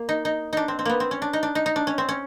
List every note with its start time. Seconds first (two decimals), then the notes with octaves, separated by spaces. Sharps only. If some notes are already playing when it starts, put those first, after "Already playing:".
Already playing: A#3
0.09 D#4
0.25 D#4
0.53 D4 D#4
0.68 C4
0.79 C4
0.85 A#3 B3
1.00 C4
1.11 C#4
1.22 D4
1.33 D#4
1.43 D4
1.55 D#4
1.66 D#4
1.76 D4
1.87 C#4
1.98 C4
2.09 C#4